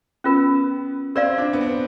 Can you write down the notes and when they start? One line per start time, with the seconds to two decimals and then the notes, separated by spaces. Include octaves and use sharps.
0.24 B3 C#4 F4 A#4
1.15 C4 G4 A#4 D5 F5
1.38 D4
1.53 B3
1.61 C4